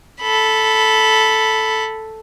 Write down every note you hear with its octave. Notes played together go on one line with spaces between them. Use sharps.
A4 B5